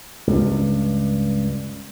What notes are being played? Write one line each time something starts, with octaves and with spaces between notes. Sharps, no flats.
C#2 G2